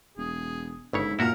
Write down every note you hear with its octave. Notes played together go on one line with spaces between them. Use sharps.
E1 G#4
G1 G#2 C#3 E4 C#5
A#2 E4 F#4 A#4 E5 F6